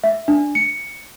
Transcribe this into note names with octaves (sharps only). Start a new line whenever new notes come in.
E5
D4
C#7